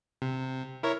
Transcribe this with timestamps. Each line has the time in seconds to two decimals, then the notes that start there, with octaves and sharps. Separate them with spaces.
0.22 C3
0.83 E4 A#4 C#5